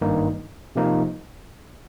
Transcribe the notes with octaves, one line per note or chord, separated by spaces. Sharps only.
G#1 G2 D#3 A#3 D#4
C3 F3 A#3 D#4